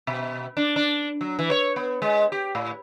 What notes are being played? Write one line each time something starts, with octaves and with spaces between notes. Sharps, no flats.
B2
D4
D4
F#3
E3
C#5
B3
G#3
G4
A2